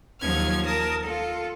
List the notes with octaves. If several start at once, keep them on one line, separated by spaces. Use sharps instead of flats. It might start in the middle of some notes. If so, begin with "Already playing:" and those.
D#2 F3 F#3 F6 G#6
A#4 A5 D#6
F4 A4